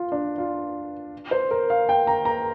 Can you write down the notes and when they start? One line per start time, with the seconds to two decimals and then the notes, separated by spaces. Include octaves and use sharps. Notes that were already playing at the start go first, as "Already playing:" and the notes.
Already playing: F4
0.12 D4
0.38 F4
1.31 C5
1.51 A#4
1.70 F5
1.89 G5
2.07 A#5
2.25 A#5